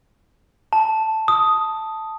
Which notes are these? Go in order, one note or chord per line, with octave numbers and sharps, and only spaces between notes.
A5
D#6